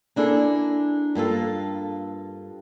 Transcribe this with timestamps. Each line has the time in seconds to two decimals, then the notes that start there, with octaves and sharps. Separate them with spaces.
0.16 A#3 D4 E4 G#4 A4
1.15 G2 A#3 F4 A4